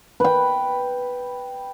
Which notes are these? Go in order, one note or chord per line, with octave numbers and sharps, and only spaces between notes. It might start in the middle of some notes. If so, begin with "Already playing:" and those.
B4 G5